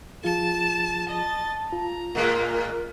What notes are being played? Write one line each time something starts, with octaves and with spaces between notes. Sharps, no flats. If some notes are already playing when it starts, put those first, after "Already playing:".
F3 F4 G#4 A5 E7
D#5 A5 A6
F4 A#5
A2 G#3 A#3 A#4